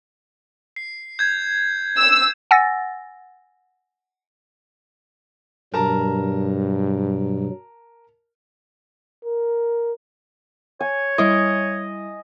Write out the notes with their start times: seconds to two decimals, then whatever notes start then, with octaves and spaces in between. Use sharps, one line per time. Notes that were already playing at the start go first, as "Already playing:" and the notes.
0.76 C7
1.19 G6 G#6
1.98 E6
2.51 F#5 G#5 E6 A6 A#6
5.74 G2 B2 F#3 A#4 A5 A#5
9.25 A#4
10.81 C#5 G#5
11.18 G3 E4 D#5 E5